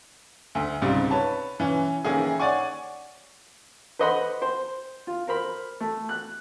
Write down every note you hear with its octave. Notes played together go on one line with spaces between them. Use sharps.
D2 E5
C#2 G#2 C3 G3
B4 C#5 A5 B5
E3 C#4
D#3 E3 A#3 C#4 E4 G#4
C#5 D5 F#5 G#5 C#6
B4 C5 D#5 F#5 B5 C6
C5
F4
A#4 C5 B5
A3
F#6